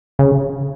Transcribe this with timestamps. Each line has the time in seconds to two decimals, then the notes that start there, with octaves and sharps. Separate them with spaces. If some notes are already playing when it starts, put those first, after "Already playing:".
0.19 C#3